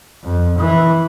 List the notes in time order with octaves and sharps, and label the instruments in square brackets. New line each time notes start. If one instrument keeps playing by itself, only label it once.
[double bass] F2
E3